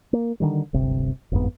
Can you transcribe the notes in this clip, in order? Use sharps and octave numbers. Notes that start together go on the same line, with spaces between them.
A#3
D3 D#3 G3
D1 G1 C3
G1 F2 G#2 B3